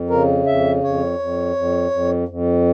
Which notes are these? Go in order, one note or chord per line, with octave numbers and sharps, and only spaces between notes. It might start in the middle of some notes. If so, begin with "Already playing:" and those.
Already playing: F2
C#3 A#4
F2 E5
F2 C#5
F2
F2
F2
F2